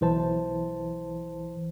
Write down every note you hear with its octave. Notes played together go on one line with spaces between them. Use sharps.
B1 E3 C5 A5